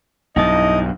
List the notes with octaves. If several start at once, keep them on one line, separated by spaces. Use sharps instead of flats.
B1 G2 D#4 E4 D#5 A5